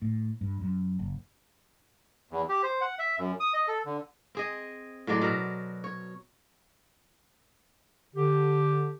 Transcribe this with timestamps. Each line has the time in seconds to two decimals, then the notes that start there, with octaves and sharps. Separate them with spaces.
0.02 A2
0.41 G2
0.61 F#2
0.99 F#1
2.31 E2
2.49 G4
2.63 C5
2.81 F#5
2.99 E5
3.19 F#2
3.40 D#6
3.54 D#5
3.68 A4
3.85 D3
4.35 C4 G#4 D#5
5.07 A2 F#3 G#3 D5
5.21 B2 F#3 A#4
5.84 C#5
8.15 D3 G4